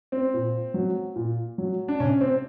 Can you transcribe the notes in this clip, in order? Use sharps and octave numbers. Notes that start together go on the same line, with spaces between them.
C4
A#2
F#3
A#2
F#3
D4
C3 C#4
C4